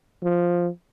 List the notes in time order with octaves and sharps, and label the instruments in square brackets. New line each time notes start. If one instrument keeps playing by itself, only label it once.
[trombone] F3